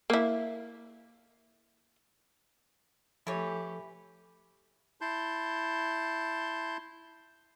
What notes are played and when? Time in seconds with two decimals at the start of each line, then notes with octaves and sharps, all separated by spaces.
0.10 A#3 E4
3.27 E3 F3 A3 G4 A4 C#5
5.01 E4 A5 C6 G6